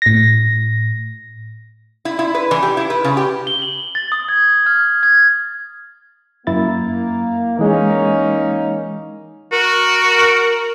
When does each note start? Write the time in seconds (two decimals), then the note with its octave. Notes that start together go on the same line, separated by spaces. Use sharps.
0.02 A2 A#6
2.05 E4
2.19 E4
2.35 B4
2.51 E3
2.62 G4
2.77 E4
2.90 B4
3.04 C#3
3.17 G4
3.47 G7
3.62 F#7
3.95 A6
4.12 D#6
4.29 G#6
4.66 F6
5.03 G#6
6.47 F#2 A#3 E4 A6
7.59 E3 G#3 A#3 C#4 D#4
9.52 F#4 A#4